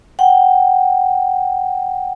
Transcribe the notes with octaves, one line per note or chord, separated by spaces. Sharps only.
F#5 G5